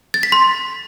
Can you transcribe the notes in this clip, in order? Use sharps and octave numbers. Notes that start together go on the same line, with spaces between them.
A6
B6
C6